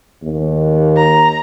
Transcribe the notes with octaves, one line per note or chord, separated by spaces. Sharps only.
D#2
A#5